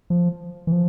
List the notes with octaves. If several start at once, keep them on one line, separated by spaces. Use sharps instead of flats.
F3
E3
F3